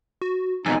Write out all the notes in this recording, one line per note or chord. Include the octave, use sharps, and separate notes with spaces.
F#4
F2 B2 D#4 G#5